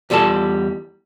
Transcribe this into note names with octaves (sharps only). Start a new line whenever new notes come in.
E2 G3 F4 A4 A5